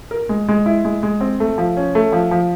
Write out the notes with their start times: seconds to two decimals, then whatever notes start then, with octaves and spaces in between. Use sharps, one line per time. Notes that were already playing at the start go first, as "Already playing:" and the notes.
0.11 A#4
0.29 G#3
0.49 G#3
0.66 E4
0.85 G#3
1.03 G#3
1.21 C4
1.40 A3
1.58 F3
1.77 C#4
1.95 A3
2.12 F3
2.31 F3